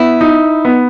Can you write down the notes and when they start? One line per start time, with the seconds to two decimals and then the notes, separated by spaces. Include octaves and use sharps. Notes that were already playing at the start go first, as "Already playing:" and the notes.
Already playing: B3 E4
0.21 D#4
0.65 B3